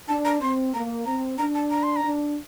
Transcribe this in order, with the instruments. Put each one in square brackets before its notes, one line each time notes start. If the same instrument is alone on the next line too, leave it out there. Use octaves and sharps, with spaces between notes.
[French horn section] D4 [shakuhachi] A5
[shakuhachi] A#5
[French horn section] C4 [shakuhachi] C6
[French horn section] A#3 [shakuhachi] A#5
[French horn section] C4 [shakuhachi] A#5
[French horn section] D4 [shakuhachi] A#5
[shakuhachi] A5
A#5
C6
A#5
[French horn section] D4